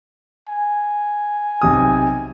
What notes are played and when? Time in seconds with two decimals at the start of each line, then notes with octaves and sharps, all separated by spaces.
0.48 G#5
1.62 B1 C3 D#6